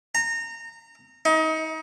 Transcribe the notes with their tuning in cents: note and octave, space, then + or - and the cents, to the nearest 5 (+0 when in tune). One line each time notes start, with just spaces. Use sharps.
A#5 -25
D#4 +30